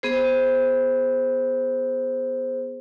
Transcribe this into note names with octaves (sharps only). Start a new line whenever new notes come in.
B3 G#4 C5